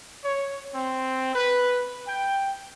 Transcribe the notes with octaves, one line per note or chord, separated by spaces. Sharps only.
C#5
C4
B4
G5